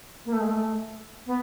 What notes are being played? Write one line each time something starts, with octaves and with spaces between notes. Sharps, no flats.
A#3
A3
G#3
A3
B3